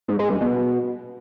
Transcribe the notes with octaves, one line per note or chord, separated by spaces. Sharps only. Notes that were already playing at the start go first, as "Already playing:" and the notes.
G#2
G#3
G2
B2